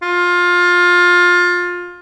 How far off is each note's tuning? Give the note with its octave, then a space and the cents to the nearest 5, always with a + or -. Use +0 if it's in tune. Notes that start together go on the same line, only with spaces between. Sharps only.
F4 +20